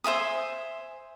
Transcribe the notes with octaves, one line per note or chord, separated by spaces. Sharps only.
C5 E5 G#5 D#6